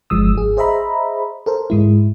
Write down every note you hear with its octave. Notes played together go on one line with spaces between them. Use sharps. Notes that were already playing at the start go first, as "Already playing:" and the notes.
G1 F3 G#3 D#6 E6
G#1 G#4
G#4 C5 D#5 E5 A#5 B5
A4 A#4 C5
G#2 G#3 E4